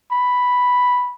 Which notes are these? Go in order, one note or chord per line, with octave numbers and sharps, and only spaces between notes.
B5